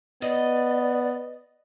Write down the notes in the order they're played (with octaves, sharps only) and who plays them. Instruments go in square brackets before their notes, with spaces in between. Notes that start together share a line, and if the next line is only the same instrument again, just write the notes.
[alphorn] B3 [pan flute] D5 [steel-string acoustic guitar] D#5